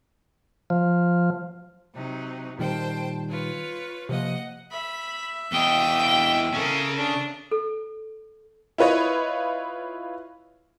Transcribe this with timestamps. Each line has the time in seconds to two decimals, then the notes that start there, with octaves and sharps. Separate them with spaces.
0.70 F3
1.93 C3 F#3 D#4
2.59 A#2 D#3 G3 C5 G5 A5
3.28 F4 B4 C#5
4.09 C3 F3 A#3 D#5 F#5
4.72 E5 B5
5.52 E2 D#5 G5
6.53 C#3 C#4 A4 A#4
6.97 D4
7.51 A4
8.78 E4 F4 B4 C#5 D#5